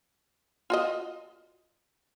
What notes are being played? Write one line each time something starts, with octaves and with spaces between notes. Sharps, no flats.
F4 F#4 D#5